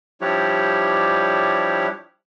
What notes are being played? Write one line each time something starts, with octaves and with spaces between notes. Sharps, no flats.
F3 G3 D4 E4 G4 C#5